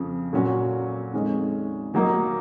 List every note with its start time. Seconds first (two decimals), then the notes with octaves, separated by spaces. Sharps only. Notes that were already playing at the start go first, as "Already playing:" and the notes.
Already playing: F2 C#3 F3
0.33 A#2 F#3 C#4 F#4
1.13 F2 D#3 G#3 C#4
1.94 D#3 F#3 A#3 D#4